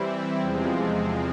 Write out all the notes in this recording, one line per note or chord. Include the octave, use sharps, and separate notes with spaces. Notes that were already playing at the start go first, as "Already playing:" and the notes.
Already playing: E3 G3 C4 E4
E2 C3 F3 G#3 C4